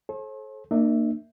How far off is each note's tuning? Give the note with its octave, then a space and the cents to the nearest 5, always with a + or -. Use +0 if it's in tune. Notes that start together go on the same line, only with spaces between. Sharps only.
A4 -35 C5 +45
A#3 -15 D4 +45 E5 +0